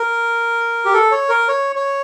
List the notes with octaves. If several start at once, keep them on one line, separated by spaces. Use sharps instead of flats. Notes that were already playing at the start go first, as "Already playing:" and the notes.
Already playing: A#4
G4
A4
C#5
A#4
C#5
C#5